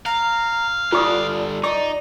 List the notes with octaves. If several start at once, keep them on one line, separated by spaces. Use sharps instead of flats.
F5 A#5
G2 D3 F4 D5 D6 D#6
D#4 D5 D6